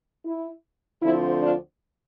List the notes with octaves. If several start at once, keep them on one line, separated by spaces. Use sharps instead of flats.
E4
D2 D3 F3 C4 E4
D4 F4